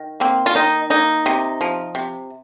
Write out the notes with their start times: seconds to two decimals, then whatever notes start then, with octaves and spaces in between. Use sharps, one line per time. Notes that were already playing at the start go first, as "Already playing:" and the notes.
Already playing: D#3
0.20 A#3 C4
0.46 F4
0.55 D#3 D#4
0.90 A#3 D#4
1.26 C3
1.61 F3
1.95 C3